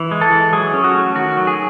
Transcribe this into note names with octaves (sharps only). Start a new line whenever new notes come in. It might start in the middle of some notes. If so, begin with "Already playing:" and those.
Already playing: E3
G#3
A4
E3
F#3 G#4
C#4
F#4
A3
D#3 F#4
F#3
G#4